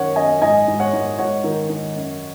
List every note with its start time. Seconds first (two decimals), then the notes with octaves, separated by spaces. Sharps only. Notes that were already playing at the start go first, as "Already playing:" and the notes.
Already playing: F#2 D#3 A#4 C#5 F#5
0.16 F#2 D#5 G#5
0.41 G#2 D#5 G#5
0.68 G#2
0.80 C#5 F#5
0.93 G#2
1.18 G#2 C#5 F#5
1.44 D#3
1.70 D#3
1.96 F#2